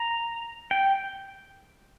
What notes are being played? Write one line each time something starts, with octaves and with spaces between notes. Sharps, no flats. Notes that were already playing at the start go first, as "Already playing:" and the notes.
Already playing: A#5
G5